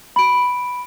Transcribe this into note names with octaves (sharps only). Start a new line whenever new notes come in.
B5 D7